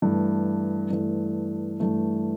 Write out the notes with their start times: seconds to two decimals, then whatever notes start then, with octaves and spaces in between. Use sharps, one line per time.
0.02 G2 E3 A3
0.90 G2 E3 A3
1.80 G2 E3 A3